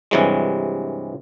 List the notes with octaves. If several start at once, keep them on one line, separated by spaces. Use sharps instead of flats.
G2 C3 E3 F#3 G#3